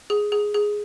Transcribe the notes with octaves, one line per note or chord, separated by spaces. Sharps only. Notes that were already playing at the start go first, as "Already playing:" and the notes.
G#4
G#4
G#4